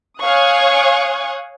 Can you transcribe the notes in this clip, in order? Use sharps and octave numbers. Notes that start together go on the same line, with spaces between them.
C#5 F5 G#5 C#6 D#6 F#6